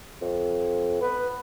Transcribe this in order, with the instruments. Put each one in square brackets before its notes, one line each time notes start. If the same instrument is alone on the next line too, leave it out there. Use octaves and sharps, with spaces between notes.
[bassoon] F2
[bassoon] B3 [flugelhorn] B4